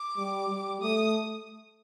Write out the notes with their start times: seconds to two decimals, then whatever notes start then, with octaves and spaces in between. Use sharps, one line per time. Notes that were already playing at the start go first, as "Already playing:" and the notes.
Already playing: D6
0.17 G3
0.49 G3
0.81 A3 D#6